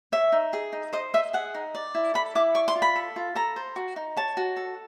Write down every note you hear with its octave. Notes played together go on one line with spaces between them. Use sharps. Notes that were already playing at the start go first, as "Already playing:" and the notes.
C#5 E5
D#4
G#4
D#4
C5 D#5
D#5 E5
G#4 F#5
D#4
D5
E4
A4 B5
E4 D6
D5 C#6
C6
F4
B5
A4
F4
A4 A#5
C5
F#4
D#4
C#5 A5
F#4
A4